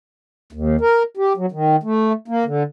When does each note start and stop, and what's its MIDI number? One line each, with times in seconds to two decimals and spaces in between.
0.53 0.76 39
0.81 1.03 70
1.17 1.33 67
1.37 1.46 54
1.52 1.76 51
1.83 2.13 57
2.28 2.44 58
2.45 2.63 50